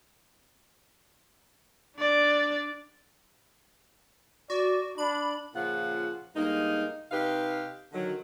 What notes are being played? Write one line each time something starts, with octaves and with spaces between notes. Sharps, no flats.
D4 D5
F#4 D5
D4 B5
A#2 C#3 F3 F4 F#5
G2 G#3 A#3 D#4
C3 D#4 G4 B4 F5
D3 D#3 F#3